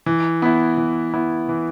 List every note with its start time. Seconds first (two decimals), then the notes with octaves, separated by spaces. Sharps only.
0.06 E3
0.42 B3 E4
0.78 E3
1.14 B3 E4
1.49 E3